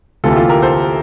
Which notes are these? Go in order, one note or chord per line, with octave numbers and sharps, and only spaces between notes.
D2 C3 E3 A#3 F4 A4
G4
F4 A4
G4 A#4
A4 C5